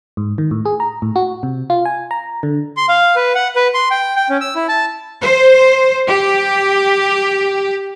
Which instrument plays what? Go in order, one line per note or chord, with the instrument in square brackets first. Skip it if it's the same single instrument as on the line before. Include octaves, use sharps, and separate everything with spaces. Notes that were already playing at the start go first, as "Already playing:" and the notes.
[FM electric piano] G#2
D#3
A2
G#4
A#5
A2
F#4
C3
F4
G#5
A#5
D3
[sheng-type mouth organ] C6
F5
B4
F#5
B4
C6
G5
G5
C#4
E6
E4
A5
[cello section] C5
G4